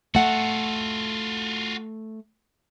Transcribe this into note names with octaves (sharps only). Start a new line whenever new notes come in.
A3 F4 F#4 F#5